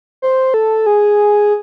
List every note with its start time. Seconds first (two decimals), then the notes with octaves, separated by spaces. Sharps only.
0.22 C5
0.54 A4
0.86 G#4